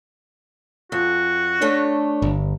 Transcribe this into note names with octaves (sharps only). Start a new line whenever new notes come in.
F2 F#4
A3 D4 A4 C#5
G1